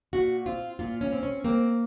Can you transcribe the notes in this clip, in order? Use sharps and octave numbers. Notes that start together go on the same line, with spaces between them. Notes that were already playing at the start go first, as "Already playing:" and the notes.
A#2 F#4
C4 F4
A#2 F4
C#4
C4
C#4
A#3 C4